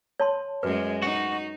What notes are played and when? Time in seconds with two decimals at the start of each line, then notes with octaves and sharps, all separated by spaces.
0.20 C#5 A5 C6
0.63 F#2 G#3 B4
1.02 D#4 F#4